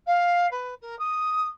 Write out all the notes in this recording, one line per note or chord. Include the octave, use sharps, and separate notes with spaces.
F5
B4
A#4
D#6